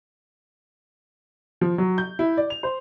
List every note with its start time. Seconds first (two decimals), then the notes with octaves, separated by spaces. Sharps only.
1.61 F3
1.78 F#3
1.98 G6
2.19 E4
2.37 D5
2.50 F7
2.63 C5